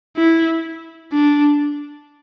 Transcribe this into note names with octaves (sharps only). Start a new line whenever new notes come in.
E4
D4